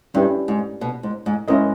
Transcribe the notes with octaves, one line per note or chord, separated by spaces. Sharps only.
G2 C#4 E4 G4 B4
G#2
B2
G#2
G#2
G#2 C#4 E4 A#4 D#5